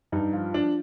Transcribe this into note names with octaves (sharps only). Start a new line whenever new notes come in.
G2 D#4
F3 F4
F3 D4